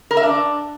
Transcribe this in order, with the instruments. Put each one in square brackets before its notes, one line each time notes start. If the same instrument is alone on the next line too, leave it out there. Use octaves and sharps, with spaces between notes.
[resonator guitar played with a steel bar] A#4
E5
D4